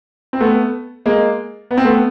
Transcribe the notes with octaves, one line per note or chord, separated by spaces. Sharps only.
C4
A3 B3
G#3 A#3
B3
C4
A3 B3